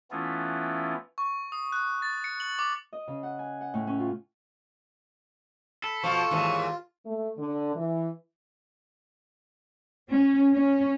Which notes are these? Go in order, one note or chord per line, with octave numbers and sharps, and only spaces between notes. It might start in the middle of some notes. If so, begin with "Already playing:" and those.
E3 A3 B3 C#4 E4 F4
C#6
D#6
F#6
A6
C#7
F#7
D6
D#5
C#3
F#5
G#5
F#5
A2
C#4
F4
A4 B5
B2 F3 F4 C#6
D#2 G#2 E3
A3
D3
E3
C#4
C#4